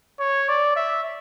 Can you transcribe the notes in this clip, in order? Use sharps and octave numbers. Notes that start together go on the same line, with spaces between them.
C#5
D5
E5